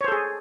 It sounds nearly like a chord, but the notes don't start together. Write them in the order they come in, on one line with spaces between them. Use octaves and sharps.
C#5 C5 A4 G#4